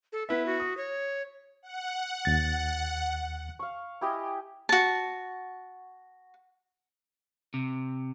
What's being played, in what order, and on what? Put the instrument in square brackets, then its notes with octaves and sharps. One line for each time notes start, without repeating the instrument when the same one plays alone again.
[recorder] A4
[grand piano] B3 E4 E5 [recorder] B4
[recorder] F#4
[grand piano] D#6
[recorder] C#5
[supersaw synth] F#5
[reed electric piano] D#2 A6
[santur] F5 C#6
E4 G4 D#5 G#5
[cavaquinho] F#4 A5
[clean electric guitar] C3